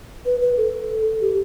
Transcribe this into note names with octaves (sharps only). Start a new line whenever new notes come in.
B4
B4
A4
G4